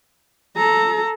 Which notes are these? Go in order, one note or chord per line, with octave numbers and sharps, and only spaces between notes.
A4 A#5